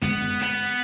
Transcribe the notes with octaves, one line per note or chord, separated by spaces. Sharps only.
G#3 B3
B3